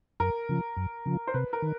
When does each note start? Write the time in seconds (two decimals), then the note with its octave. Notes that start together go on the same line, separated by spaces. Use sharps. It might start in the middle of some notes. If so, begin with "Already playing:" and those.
0.20 F#2 A#4
0.49 C#3 F3
0.77 F#2
1.06 C#3 F3
1.27 C5
1.34 C3 B4
1.53 A#4
1.62 D#3